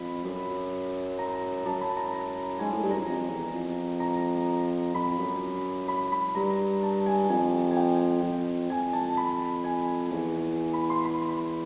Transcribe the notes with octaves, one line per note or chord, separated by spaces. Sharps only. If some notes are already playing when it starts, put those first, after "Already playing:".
Already playing: F2 B5
F#2
A#5
F#2 A5
B5
A#5
G#2 G#5
A2
G2
F#2 A#5
F2
E2
F2
A#5
F2 B5
F#2
B5
B5
G2 A#5
A5
G#5
F2 G#5
G#5
G5
F2
F2 G#5
A5
B5
G#5
E2
B5
C6
B5
B5